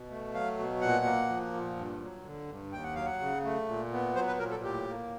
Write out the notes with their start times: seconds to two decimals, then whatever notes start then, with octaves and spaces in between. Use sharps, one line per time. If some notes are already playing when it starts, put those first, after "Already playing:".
Already playing: B2
0.10 A3
0.34 F#3 F5
0.58 B2
0.81 A#2 F#5
1.05 A#3
1.29 F3
1.53 A#2
1.76 G2
2.01 F#3
2.24 D3
2.49 G2
2.72 D#2 G5
2.84 F#5
2.95 F#3 F5
3.05 F#5
3.20 C#3
3.44 A3
3.68 A#2
3.92 B3
4.15 F#3 C5
4.27 B4
4.39 A#2 A#4
4.51 A4
4.64 A2 G4
4.87 A#3